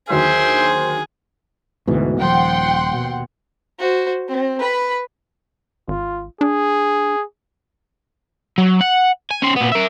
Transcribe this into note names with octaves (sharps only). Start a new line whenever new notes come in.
D#2 D3 F#3 G#4 C5 E5 G5 C6
D2 G#2 B2 E3
D#1 F3 F#5 G5 C6
D#2 B2
F#4 C5
C4
B4 B5
G#1 F4
D4 G#4
F#3
F#5
G#5
C#4 C5
A#2 B3
A#4 E5